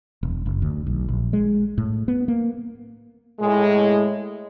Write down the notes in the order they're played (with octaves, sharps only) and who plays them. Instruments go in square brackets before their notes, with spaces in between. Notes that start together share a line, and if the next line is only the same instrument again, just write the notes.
[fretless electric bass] E1
F#1
D2
B1
A#1
G#3
A2
B3
A#3
[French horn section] A2 G#3